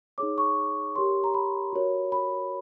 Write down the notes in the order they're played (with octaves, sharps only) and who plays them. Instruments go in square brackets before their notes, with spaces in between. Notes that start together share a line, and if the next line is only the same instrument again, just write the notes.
[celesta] D#4 G#4 C#5 D6
C#6
G4 A#4 C#5 C6
A#5
B5
F#4 A#4 C#5
B5